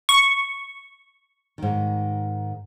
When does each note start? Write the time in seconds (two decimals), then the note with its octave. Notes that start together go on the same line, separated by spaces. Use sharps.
0.09 C#6
1.58 G#2 D#3